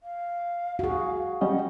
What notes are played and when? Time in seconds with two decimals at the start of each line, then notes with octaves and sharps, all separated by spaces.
0.03 F5
0.79 F#4 G#4
1.41 G3 C#4 D#5 F#5